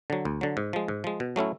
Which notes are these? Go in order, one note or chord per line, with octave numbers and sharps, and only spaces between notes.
D3 F#3
D2
D3 F#3
G#2
F3 G#3
G#2
F3 G#3
B2
F#3 A3 C#4 E4